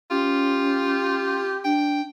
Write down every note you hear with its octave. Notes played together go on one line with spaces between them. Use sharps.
C#4 F4 G4
D4 G5